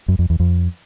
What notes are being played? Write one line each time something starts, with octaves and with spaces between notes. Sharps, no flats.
F#2
F2
E2
F2